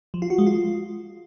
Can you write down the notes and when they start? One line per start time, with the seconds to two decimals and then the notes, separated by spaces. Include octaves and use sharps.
0.14 F3
0.22 F4
0.30 F#4
0.38 G#3
0.47 F4